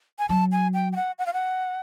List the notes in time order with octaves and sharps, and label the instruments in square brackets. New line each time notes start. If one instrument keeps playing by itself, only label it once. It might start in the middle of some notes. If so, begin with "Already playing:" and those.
[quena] G#5
[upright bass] F#3 [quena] A5
[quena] G#5
G5
G5
F#5
F#5
F5
F#5